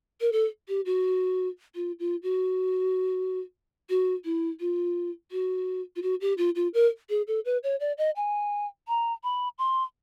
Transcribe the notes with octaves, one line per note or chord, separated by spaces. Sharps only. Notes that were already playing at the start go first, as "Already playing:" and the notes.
A#4
A4
G4
F#4
F4
F4
F#4
F#4
E4
F4
F#4
F4
F#4
G4
F4
F4
A#4
G#4
A4
B4
C#5
D5
D#5
G#5
A#5
B5
C6